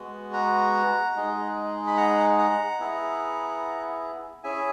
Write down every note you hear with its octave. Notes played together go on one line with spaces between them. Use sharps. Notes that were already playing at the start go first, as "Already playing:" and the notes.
Already playing: G#3 B3 F#4
F#5 A#5
G#3 D#4 G#4
B5
F#5 A#5
F#5 A#5
B3 E4 G#4
C#4 E4 G#4 E5 G#5